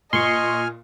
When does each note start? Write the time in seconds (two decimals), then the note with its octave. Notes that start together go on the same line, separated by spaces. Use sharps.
0.13 A#2 D#5 G#5 C6 C#6 F6